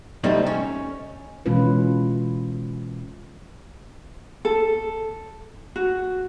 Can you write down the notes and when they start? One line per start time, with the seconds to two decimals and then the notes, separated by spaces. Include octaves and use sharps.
0.24 C2 G3 A3 C4 D#4
0.46 C#4
1.46 B2 E3 G#3 C#4 F4 B4
4.45 A4
5.76 F#4